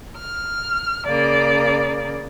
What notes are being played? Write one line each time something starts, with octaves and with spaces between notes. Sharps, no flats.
F6
C#3 A#3 D5